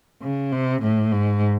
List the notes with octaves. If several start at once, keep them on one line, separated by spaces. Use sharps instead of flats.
C#3
C3
A2
G#2